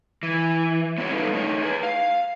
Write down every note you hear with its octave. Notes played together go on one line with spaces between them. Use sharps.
E3
B3 C#4 E4 F#4 C#5
G3 D#4 F4 A4 B4
A3 D#4 C#5
G#4 B4
F5